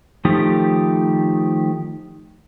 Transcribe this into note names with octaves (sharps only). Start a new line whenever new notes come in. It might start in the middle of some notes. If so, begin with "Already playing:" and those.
D#3 F3 A3 D#4 G4